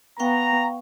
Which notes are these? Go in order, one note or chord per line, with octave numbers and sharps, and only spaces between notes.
B3 F5 G5 A#5 C#6